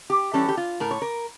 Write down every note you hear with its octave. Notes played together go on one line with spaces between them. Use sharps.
G4
E3 G3 C#4 A4
G4
F4
A2 A#4
C#5
A#4